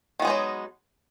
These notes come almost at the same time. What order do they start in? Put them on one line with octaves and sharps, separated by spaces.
D#3 B3 G#3 D#4 F#3